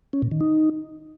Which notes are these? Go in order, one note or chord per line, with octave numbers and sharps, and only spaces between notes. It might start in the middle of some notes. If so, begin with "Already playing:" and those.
C#4
A#2
D#3
D#4